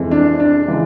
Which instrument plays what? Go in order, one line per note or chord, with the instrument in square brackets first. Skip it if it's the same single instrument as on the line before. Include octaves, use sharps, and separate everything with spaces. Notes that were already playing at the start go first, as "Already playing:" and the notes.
Already playing: [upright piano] F2 C3 E3 G#3
D4
D4
C#3 E3 G#3